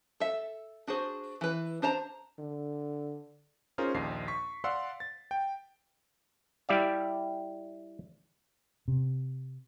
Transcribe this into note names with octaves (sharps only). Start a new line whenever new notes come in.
A4 E5
D4 F#4 G#4 C5
E3 B4
D4 C5 A5 A#5
D3
C#4 D#4 F4 G#4 A#4 C5
A#1 D#2 D#4 C7
C#6 B6
D5 F5 F#5 C6 E6
A6
G5
G3 E4 G4 D5 E5 F5
C3